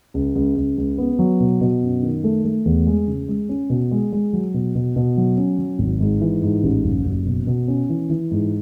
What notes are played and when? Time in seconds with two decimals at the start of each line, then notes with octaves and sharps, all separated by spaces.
0.14 C#2
0.35 C#2
0.56 C#2
0.78 C#2
0.98 B3
1.19 F#3
1.40 B2
1.61 B2
1.82 F#2
2.03 D#3
2.24 A3
2.45 A3
2.65 E2
2.87 G#3
3.08 C#3
3.28 G#3
3.49 C#4
3.70 B2
3.91 G#3
4.12 G#3
4.33 F#3
4.54 B2
4.75 B2
4.96 B2
5.17 F#3
5.37 C#4
5.58 F#3
5.79 G#1
6.01 G#2
6.21 E3
6.42 G#2
6.63 A1
6.84 F#1
7.05 F#1
7.26 B2
7.47 B2
7.68 C#4
7.89 E3
8.10 E3
8.31 G#2